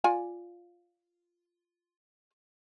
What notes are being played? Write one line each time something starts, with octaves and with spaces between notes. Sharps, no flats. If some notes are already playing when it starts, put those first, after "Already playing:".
F4 D5 G#5